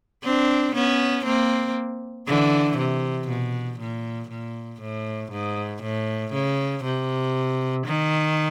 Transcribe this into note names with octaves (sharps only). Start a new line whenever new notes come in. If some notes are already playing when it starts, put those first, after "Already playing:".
C4 D4
B3 C#4
A#3 C4
D3 E3
C3
B2
A#2
A#2
A2
G#2
A2
C#3
C3
D#3